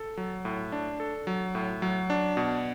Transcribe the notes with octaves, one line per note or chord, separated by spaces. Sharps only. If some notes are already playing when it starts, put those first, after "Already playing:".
Already playing: A4
F#3
A2
D4
A4
F#3
A2
F#3
D4
B2